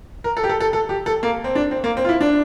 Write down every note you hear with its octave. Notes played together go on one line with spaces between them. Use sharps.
A#4
A4
G4
A4
A4
A4
G4
A4
A#3
C4
D4
C4
A#3
C4
F4
E4
D4